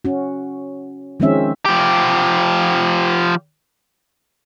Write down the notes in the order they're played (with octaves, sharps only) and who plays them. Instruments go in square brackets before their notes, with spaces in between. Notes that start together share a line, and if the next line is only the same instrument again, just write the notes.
[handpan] C#4 F#4
D#3 F3 G#3 C4 C#4 E5
[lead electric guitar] F3 G4